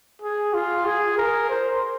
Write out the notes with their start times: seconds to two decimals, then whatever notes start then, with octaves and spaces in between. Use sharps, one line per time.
0.22 G#4
0.54 F4
0.85 G#4
1.18 A#4
1.49 C5